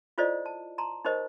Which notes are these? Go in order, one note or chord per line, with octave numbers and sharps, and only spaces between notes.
E4 F4 A4 C5 D5 D#5
A5
A5 A#5 C6
D#4 G4 A#4 C5 D#5